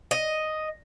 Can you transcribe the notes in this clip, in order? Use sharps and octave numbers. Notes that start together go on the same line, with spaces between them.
D#5